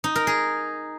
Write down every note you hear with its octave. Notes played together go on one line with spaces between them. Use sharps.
D#4
A#4
G#4